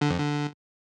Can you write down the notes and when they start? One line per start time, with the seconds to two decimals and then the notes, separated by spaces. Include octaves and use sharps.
0.01 D3
0.10 F2
0.18 D3